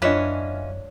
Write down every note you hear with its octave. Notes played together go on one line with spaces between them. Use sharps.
F#2 E3 C#4 D4 F4 C#5 D#5 B6